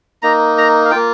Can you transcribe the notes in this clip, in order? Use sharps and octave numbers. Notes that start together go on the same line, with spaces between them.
A#3 D#4 A#5
A#5
F5
A#3 F4 G5